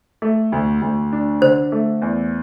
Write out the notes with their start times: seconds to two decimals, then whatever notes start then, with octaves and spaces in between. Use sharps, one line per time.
0.22 A3
0.52 D2
0.82 D2
1.12 D4
1.41 D3 C5
1.72 A3
2.02 E2